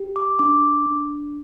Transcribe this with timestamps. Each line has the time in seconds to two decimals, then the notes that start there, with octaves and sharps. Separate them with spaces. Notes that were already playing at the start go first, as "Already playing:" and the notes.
Already playing: G4
0.16 D6
0.39 D4 D6
0.86 D4